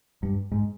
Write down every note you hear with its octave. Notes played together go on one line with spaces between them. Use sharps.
G2
G#2